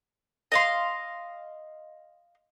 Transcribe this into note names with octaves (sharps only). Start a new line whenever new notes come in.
D#5 F5 C6